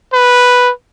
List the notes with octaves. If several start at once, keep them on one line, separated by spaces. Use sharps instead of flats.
B4